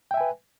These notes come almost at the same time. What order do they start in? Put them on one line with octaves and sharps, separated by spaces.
G5 E5 G#5 B4